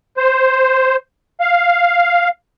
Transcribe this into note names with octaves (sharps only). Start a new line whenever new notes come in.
C5
F5